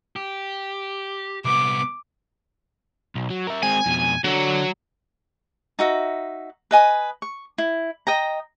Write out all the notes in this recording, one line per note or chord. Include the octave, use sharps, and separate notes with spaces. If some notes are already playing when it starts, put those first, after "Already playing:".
G4
C2 B3 D6
B1
F#3
A#4 E5
G#3 C4 G#5
F2 B2
D3 F#3
D#4 F#4 E5
B4 D#5 G#5 D#6
C#6
E4
D#5 G5 A#5